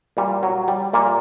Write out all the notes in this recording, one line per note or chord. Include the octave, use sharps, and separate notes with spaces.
A#2 G3
F#3
G3
A#2 A#3